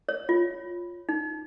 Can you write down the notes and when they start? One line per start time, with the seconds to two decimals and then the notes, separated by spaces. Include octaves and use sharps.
0.09 C#5
0.29 F4
1.09 D#4